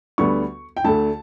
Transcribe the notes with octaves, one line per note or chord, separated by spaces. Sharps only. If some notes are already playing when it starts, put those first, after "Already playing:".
D2 D3 G3 B3 C#6
G5
D2 D3 A3 A5